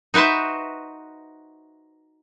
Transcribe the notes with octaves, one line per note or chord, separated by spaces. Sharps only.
D#4 F#4 B4 C5 E5